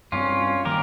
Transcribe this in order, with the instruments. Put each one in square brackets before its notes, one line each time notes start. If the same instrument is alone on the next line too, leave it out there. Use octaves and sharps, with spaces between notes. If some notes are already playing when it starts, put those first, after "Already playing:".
[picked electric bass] G2 G3 C4 [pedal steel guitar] C#4 F4
[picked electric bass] D#3 G3 A#3 [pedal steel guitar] G4 A#4